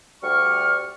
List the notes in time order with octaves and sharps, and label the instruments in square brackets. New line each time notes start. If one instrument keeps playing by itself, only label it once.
[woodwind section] D2 G3 D5 C#6 F6